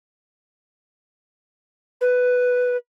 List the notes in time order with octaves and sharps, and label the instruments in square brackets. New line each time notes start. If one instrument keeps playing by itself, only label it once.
[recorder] B4